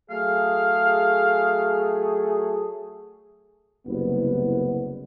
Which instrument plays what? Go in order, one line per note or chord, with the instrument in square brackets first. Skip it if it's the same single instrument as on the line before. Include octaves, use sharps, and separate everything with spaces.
[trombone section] F#3 A3 G#4 [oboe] F5
[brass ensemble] F#1 C2 B3